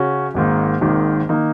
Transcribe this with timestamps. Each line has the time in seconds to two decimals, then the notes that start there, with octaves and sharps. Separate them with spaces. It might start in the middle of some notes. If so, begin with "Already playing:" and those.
Already playing: C#3 C#4 F#4
0.34 G#1 G#2 D#3 A#3
0.81 G#1 G#2 D#3 A#3
1.29 D#3 A#3 D#4